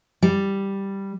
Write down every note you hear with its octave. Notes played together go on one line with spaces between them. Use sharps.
G3